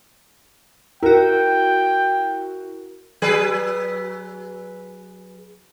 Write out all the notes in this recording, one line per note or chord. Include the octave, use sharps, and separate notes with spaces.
E4 F#4 A#4 G5
F#3 G#4 B4